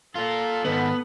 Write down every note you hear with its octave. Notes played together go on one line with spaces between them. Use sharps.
A#3 F4 A4
G#2 D#3 B3